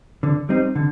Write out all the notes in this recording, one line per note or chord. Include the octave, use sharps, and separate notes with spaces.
D3
G3 C4 D#4
D3